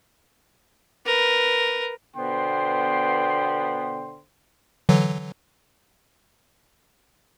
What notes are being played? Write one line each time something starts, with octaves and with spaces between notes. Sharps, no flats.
A#4 B4
B2 D3 B3 C5 G5 C6
D3 E3 F#3